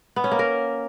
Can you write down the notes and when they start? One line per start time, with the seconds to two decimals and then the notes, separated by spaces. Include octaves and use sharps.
0.16 B3
0.24 C#4
0.31 A#3
0.39 A#4